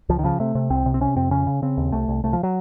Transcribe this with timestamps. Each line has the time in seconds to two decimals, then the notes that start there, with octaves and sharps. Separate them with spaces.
0.09 C#2 F3
0.19 D#3
0.24 C#3 F3
0.40 C3 A3
0.55 C3
0.70 C2 C4
0.86 C3
0.94 C4
1.01 C3 C#4
1.16 F2 C4
1.31 C#3 C#4
1.47 C#3
1.62 C#3 C4
1.77 D#2
1.92 C2 A3
2.08 C2
2.24 C2 A3
2.33 F3
2.43 F#3